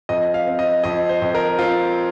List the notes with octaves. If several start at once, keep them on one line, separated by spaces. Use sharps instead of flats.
F2 D#5
F5
C4
D#5
F2 D#5
C5
F2
A#4
C4 F4